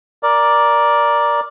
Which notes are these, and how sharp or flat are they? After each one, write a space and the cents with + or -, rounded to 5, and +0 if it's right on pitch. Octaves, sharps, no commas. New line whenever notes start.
A#4 +10 D5 +0